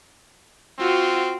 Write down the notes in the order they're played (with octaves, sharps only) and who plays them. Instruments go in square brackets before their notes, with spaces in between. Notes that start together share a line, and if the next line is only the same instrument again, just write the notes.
[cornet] C4 [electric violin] F4 F#4